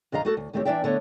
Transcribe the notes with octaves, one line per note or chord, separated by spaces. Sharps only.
F2 D3 D#5 F5 A#5
A3 F#4 A4
D2
D2 D#3 A3 C4 G4 C#5
E3 F3 D4 D5 E5 G5
D3 A3 B3 C#5